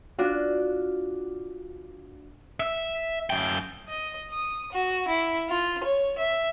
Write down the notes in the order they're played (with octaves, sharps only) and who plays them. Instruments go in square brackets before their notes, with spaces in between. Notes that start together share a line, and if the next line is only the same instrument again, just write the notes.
[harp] D4 F4 F#4
[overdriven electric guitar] E5
F#2 G5
[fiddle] D#5
D#6
F#4
E4
F4
C#5
E5